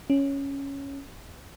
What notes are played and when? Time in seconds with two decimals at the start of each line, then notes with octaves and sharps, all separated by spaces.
0.10 C#4